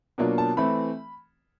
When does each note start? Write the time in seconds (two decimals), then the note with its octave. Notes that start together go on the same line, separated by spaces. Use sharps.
0.18 B2 F#3 A#3 D4 F4
0.38 A5
0.57 E3 A3 C4 B5